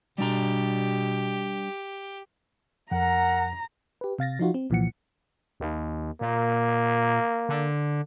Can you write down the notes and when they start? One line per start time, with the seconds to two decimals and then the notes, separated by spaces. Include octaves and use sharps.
0.18 B2 G3 D4 G4 A#5
2.91 F2 A#4 F#5 A#5
4.01 G4 B4
4.19 C3 F5 A6 A#6
4.39 F3 D#4 F4 F#4
4.54 C4
4.70 C2 A#2 E3 F3 F#5 C#7
5.60 D#2
6.21 A#2 A#3
7.49 D3